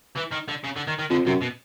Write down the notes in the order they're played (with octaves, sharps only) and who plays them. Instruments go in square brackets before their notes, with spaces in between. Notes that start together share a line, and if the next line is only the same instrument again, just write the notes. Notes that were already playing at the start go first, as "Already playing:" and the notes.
[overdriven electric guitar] E3
D#3
D3
C#3
D3
D#3
D#3
[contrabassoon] F2 [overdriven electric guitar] D3
[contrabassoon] F#2 [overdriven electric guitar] C3
[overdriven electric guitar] B2